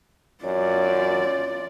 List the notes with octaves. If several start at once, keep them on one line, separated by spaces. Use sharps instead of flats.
F#2 F4 C#5 D5